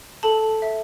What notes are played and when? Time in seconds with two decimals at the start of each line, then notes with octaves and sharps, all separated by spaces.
0.23 A4 A5
0.62 E5